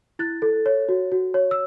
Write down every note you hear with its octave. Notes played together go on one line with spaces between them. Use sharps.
E4 F#6 A6
A4
C#5
F#4
F#4
C#5
E6